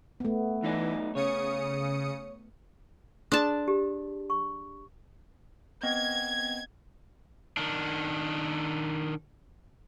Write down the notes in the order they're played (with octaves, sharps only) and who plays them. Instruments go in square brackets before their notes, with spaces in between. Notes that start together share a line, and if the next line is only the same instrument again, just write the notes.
[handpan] A3 B3
[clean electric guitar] B1 D#4 D5 [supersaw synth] E3
[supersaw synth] C#3 D#6 C#7 [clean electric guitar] C#5
[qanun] D4 A5 [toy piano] G#4 C6 D#6
[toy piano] G4
C#6
[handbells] B3 C4 D#5 [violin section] G#6
[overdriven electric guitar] D#3 D4